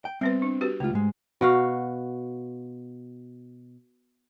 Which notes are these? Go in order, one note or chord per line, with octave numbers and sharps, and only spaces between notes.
G5
G3 B3 C4 B4
D4
F#4 G4 B4
C#2 A3 F4
G#2 G#3
B2 F#4 F5